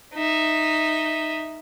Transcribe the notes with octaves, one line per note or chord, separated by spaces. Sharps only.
D#4 E5